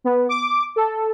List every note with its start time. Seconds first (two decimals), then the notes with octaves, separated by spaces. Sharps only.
0.04 B3
0.29 D6
0.76 A4